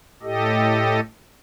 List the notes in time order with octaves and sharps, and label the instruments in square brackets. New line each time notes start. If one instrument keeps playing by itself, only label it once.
[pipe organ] A2 G4 A4 D#5